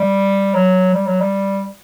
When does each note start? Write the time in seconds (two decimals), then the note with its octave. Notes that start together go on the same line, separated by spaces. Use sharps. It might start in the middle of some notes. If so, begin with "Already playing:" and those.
Already playing: G3
0.54 F#3
0.94 G3
1.07 F#3
1.21 G3